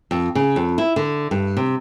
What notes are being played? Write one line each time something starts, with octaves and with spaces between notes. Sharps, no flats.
F2
C#3
F2
E4
D3
G2
C3